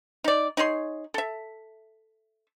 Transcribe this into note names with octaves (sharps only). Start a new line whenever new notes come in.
D#4 D5
D#4 G#4 C#5 C6
A4 E5